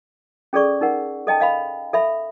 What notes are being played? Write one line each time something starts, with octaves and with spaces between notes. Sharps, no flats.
C#4 G#4 A4 D5 C#6
D#4 A#4 F#5
A4 D#5 G5 A5
D#5 F5 B5
A4 E5 B5